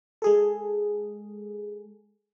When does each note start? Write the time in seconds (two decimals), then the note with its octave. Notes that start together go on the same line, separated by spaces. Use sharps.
0.22 G#3 G#4 A4